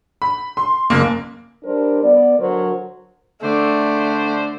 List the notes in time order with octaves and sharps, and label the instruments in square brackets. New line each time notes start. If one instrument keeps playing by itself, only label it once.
[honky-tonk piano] B5
C6
F#1 A#3
[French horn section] G3 D4 A#4 C5
B3 D5
D3 F#3 A#4 C5
[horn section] D3 C5 D5 [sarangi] A3